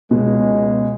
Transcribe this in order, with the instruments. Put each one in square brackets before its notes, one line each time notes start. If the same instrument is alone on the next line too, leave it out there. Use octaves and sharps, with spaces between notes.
[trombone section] C#2 G#3 [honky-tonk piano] B2